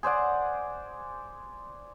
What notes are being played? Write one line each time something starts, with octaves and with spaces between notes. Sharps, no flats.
G#4 C5 D5 F#5